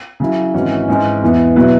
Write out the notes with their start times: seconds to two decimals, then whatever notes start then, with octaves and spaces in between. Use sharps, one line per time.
0.20 C#3 F#3 E4
0.54 G#1 G#2 E3 C#4 F#4
0.88 G#2 E3 G#3 C#4
1.22 E2 E3 B3
1.56 B2 F#3 E4 B4